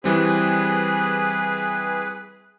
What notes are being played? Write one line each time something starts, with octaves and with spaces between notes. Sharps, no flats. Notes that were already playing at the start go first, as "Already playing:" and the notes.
E3 G3 C4 G#4 B4